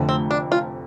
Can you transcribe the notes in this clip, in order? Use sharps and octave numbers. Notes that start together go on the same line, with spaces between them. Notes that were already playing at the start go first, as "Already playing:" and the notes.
Already playing: F1 F2 D3 F3 A3
C4
D4
F4